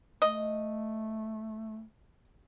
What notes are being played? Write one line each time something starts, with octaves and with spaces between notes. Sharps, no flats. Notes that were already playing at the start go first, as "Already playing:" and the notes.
A3 D#5